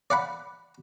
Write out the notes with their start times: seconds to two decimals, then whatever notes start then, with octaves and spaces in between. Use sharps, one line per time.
0.10 D5 F5 F#5 B5